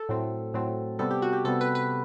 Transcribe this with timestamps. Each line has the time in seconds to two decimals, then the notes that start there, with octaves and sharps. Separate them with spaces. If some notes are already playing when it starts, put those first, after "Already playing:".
Already playing: A4
0.09 A2 F#3 A3 C4
0.54 A2 F#3 A3 C4
0.99 C3 G3 B3 A4
1.11 G4
1.22 F#4
1.33 G4
1.45 C3 G3 B3 A4
1.61 B4
1.75 B4